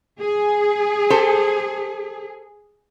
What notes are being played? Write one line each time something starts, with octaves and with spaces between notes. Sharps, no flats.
G#4
G4 A4 C5